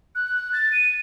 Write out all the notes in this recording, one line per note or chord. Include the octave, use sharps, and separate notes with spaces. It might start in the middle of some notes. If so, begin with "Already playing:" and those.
F#6
A6
D#7